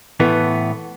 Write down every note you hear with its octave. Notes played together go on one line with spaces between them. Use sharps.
A2 E3 A3 B3